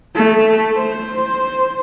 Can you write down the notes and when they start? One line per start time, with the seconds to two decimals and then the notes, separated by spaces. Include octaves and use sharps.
0.15 A3
0.77 C5